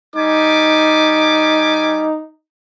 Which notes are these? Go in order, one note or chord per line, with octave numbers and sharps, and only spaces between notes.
G3 D#4 G#5 D6